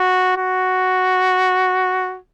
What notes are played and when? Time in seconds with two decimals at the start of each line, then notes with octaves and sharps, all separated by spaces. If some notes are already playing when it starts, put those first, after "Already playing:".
Already playing: F#4
0.37 F#4